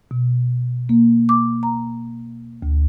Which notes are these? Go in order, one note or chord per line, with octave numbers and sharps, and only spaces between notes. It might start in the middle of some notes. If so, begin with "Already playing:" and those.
B2
A#3
D6
A#5
D2